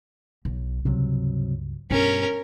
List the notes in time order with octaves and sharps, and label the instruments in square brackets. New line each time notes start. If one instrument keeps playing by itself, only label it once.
[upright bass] B1
[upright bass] C#2 G2 [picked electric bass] C3 F#3
[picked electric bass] G2 [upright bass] B2 [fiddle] C#4 A#4